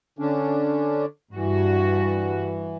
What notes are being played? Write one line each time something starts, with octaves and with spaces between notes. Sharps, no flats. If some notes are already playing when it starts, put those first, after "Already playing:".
D3 C#4 D4
G2 E3 F#4